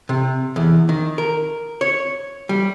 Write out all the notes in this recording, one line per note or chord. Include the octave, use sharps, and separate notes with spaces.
C3
E2
D#3
A#4
C#5
G3